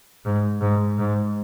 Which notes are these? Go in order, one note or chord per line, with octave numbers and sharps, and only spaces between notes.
G#2
G#2
G#2